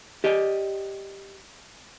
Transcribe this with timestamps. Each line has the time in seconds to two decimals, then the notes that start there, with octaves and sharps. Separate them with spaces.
0.24 G4 D5 D#5